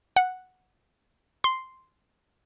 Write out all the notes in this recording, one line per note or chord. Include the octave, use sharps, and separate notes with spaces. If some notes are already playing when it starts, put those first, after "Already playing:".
F#5
C6